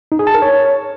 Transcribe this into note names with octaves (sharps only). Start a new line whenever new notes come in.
D#4
G#4
A5
A#4
C#5